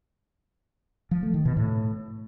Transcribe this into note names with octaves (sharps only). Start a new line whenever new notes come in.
F3
A3
D#3
B2
A2